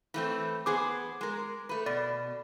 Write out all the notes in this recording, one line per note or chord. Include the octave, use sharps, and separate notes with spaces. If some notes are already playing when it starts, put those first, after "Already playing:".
E3 A3 C4
B3 G#4 C5 D6
G#3 A#4
A3 B4
B2 D5